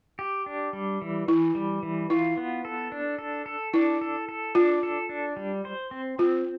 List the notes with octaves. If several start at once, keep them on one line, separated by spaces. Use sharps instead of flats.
G4
D4
G3
E3
E3 E4
G3
E3
E4 F4
B3
A4
D4
A4
A4
D4 E4
A4
A4
D4 F4
A4
D4
G3
C5
C4
C4 F4